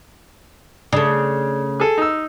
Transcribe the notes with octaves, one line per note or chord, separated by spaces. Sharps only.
C#3 A3 D4
G#4 A4
D#4 E6